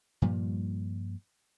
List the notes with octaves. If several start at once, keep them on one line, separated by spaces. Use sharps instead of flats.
G2 A#2 F3 G3